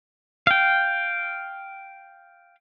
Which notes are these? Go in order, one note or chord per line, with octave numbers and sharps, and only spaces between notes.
F5 G5